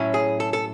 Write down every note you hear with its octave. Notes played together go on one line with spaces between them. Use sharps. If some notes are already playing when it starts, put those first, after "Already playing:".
Already playing: A2 F#3 C#4 E4
G#4
A4
A4